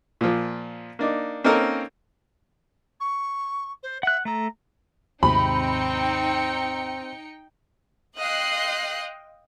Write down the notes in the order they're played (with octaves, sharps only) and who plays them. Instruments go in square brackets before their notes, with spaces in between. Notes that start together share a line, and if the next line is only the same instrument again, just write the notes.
[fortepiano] A#2 F3
A#3 D4 D#4
A#3 C4 C#4 D#4 A4 A#4
[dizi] C#6
C5
[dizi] E5 [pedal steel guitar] F#5 F#6
[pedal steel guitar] A3 A4 [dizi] A#5
[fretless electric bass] D#2 G#2 C3 [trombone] C4 [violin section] D#4 G5 C#7 [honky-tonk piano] B5
[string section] D#5 F5 G5 C6 F#6 C7